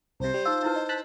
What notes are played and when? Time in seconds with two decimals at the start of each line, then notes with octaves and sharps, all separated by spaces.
0.20 C2 C3 C5
0.34 G3
0.45 D#4 F4 E6
0.63 D#4 E4 B4
0.76 D#5
0.89 A5 F#6 B6